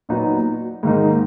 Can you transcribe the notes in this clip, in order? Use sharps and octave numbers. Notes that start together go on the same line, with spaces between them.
A#2 F#3 B3 D#4
G#2 D#3 A#3 D#4